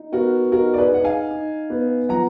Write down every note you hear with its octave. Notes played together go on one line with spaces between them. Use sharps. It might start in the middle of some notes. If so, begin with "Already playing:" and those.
Already playing: D#4
B3 F#4 A#4
D#4 F#4 A#4
D5
G#4 B4
D#4 F#5
F5 G#5
D#4
B3
F3 F#5 A#5